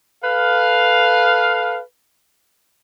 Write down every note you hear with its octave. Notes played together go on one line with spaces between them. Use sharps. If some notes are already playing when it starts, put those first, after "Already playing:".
A4 B4 F5